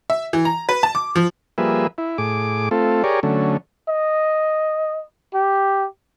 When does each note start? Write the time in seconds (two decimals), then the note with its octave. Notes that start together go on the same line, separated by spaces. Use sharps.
0.10 E5
0.33 E3
0.45 A#5
0.69 B4
0.83 A5
0.95 D6
1.16 F3
1.58 F3 G3 A#3 G#4 B4 E5
1.98 E4
2.18 A2 G#4 D6
2.71 A3 C4 F4 A4
3.04 G4 G#4 A#4 C#5 D5
3.23 D3 F#3 A3 C#4
3.89 D#5
5.34 G4